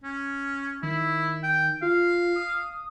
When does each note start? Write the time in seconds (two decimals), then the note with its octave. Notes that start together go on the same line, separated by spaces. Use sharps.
0.04 C#4
0.83 D#3 E4
1.43 G5
1.82 F4 F5
2.36 D#6